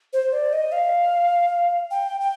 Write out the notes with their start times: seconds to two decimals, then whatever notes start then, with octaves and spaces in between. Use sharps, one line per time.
0.13 C5
0.33 D5
0.53 D#5
0.72 F5
1.91 G5
2.20 G5